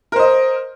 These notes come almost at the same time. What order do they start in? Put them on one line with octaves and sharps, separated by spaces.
A#4 C5 D#5